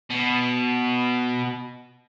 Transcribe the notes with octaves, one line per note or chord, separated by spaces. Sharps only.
B2